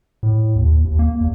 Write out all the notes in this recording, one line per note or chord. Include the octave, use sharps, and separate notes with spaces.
A2
D#2
D#2
A#3
E2